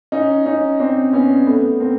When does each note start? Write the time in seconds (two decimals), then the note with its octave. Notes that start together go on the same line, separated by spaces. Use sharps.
0.12 C#4 D#4
0.46 C#4 D#4
0.79 C4 D4
1.13 B3 C#4
1.46 A3 B3
1.80 A#3 C4